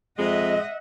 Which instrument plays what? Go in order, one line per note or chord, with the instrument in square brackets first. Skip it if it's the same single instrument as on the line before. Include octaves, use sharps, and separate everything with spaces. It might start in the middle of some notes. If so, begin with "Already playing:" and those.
[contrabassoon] F2 [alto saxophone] G#3 [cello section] D#5 [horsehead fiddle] E5 F#5